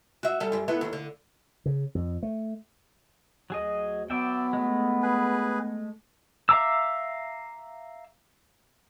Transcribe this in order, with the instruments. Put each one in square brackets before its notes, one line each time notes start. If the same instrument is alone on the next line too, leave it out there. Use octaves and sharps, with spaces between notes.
[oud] F#4 E5
G3 A4
F#2 G3
B3 E4 A4
D#2
D3
[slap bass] C#3
F2
A3
[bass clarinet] D2 [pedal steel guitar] F#3 G#4 D#5
[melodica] F#3 [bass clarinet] B3 [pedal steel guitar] D5 E5 G5
[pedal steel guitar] G#3 A3
[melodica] G#4 B4
[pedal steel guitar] E5 F5 A#5 D6 E6